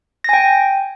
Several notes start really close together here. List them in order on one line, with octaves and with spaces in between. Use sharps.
A#6 G#5 G5